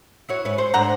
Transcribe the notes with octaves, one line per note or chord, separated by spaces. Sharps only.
E4 F#4 C#5
G#2 B4 C#5
C5
G#2 A3 D4 C5 F#5 A#5